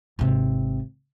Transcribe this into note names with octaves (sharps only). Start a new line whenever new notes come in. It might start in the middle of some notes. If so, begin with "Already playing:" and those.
G#1 C3